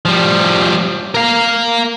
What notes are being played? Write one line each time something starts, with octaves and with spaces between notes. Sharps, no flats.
F3 G3
A#4 F5